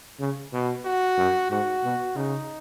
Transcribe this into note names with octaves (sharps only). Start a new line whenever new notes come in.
C#3
B2
F#4
F#2
G#2 F#4
B2
C#3 D#4